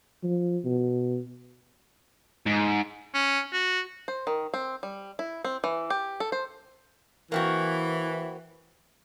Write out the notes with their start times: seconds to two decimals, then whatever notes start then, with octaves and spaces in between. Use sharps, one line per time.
0.24 F3
0.65 B2
2.46 G#2
3.14 C#4
3.53 F#4
4.08 C5
4.27 D#3
4.54 C4
4.83 G3
5.19 E4
5.45 C4
5.64 E3
5.90 G4
6.20 A4
6.32 C5
7.32 E3 A#3 C4 F#4